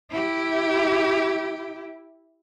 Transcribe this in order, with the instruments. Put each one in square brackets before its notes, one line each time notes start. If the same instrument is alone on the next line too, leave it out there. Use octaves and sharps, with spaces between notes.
[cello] E4 G4